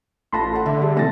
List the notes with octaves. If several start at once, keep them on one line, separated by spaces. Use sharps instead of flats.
A1 A3 F4 A5 B5 C6 A#6
A4 F#5
D3 E5
G3 G4 G#4
C3 E3 A3 A5 A6 A#6